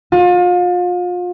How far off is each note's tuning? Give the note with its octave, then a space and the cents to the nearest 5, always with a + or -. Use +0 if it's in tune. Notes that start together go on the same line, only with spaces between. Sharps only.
F4 +35